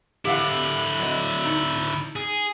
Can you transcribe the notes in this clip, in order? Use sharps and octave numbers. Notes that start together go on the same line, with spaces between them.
D3 E4 G4 F5 F#5
F#3 D#5
D#4
G#4